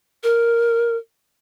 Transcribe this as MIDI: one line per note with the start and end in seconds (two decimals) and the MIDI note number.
0.23 0.96 70